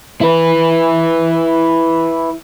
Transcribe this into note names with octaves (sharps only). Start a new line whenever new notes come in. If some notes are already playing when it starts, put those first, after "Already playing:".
E4 B4